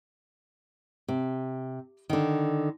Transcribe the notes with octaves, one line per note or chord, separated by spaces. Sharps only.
C3
D3 D#3